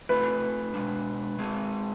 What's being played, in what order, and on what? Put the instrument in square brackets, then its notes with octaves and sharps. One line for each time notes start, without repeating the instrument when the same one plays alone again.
[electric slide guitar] A3 C4 F4 A4 [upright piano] B4
[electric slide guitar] B2 G#3 D4
G#3 C4 G#4